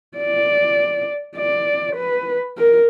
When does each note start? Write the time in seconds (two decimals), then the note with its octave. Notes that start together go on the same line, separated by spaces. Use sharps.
0.17 D5
1.37 D5
1.96 B4
2.58 A#4